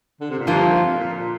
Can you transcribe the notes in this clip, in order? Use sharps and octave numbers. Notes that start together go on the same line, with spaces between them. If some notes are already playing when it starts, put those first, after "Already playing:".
D3
C3
A#2
G2 D3 F3 A#3 F4
F2
A#2
A#2